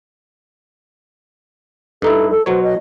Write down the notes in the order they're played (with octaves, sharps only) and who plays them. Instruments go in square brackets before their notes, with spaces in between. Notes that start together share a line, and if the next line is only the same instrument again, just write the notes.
[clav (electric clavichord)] G2 D#4 E4 [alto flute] A4
[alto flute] A4
[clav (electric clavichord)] B2 F#3 C#5 [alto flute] C5
[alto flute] D#5